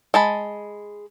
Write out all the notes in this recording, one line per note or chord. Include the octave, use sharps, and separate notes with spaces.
G#3 A5 B5